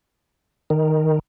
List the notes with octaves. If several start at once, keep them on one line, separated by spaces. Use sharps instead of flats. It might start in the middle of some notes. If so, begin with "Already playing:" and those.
D#3